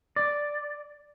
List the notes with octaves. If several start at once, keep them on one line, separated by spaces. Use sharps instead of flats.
D5